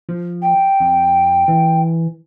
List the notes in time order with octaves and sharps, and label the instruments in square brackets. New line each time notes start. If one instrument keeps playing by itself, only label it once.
[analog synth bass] F3
[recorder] G5
[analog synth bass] F2
E3